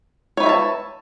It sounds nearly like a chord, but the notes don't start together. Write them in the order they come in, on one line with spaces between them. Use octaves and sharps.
C#5 B4 E5 A#5 A5